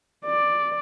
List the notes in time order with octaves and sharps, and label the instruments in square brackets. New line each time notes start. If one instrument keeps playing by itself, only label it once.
[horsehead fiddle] D5